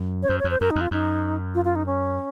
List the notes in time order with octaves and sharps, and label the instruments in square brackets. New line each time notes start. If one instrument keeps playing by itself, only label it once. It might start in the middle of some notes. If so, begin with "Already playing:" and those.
Already playing: [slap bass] F#2
[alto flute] C#5
[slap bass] F#2 [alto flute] C5
[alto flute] C#5
[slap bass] F2
[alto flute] C5
[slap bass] F#2 [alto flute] A#4
[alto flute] D#4
[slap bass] F2
[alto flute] F4
[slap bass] F#2 [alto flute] D#4
[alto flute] F4
F4
D#4
C#4